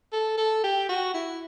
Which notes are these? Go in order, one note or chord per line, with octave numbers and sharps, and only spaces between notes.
A4
A4
G4
F#4
E4